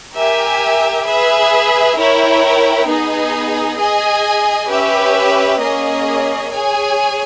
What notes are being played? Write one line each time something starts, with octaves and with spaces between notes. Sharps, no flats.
G4 A#4 E5 G#5
G#4 B4 E5
E4 A#4 C#5 G5
B3 D#4 G#4 D#5
G#4 D#5 G#5
C#4 G4 B4 E5
A#3 C#4 G#4 D#5
G#4 C#5 G#5